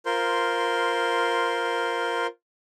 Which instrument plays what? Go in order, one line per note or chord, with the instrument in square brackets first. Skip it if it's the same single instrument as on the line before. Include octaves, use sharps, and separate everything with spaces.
[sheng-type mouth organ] F4 A#4 C5 C6